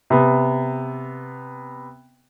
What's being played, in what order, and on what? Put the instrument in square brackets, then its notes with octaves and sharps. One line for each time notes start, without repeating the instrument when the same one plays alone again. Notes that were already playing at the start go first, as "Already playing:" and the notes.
[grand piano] C3 B3